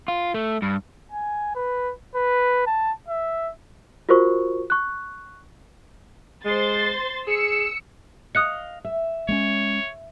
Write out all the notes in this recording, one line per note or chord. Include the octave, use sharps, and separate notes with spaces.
F4
A3
G2
G#5
B4
B4
A5
E5
F4 F#4 A#4 C5 C#6
C#6 F#6
G#3 C5 C6 A6
G#4 E6 C#7
D#5 F5 D#6 F#6 C#7
E5
G#3 A#3 C#4 C#5